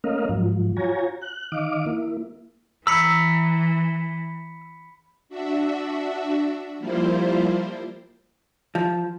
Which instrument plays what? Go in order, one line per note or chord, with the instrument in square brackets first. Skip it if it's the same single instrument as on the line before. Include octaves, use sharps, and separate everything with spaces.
[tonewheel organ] A3 A#3 C#4 A#4 D#5 F5
G#2 F3 F#3
F4 F#4 C#5 G#5 A#5
F#6
D#3 D#5 F5 D6
A#3 E4
[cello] E3 [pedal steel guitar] A#5 E6 [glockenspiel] B5 B6 C#7
[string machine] D4 F#4 E5
F3 G3 A#3 E4 F4 C5
[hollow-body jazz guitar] F3